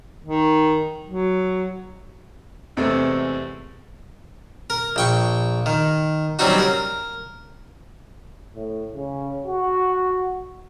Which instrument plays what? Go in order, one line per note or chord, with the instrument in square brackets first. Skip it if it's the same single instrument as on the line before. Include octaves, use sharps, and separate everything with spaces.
[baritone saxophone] D#3
F#3
[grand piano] E2 C3 G#3 A3 C4
[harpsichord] A#4
A#1 G5 C#6
D#3
F#3 G3 C4 C#4 D#4 F#4
A#4
[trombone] A2
C#3
F#4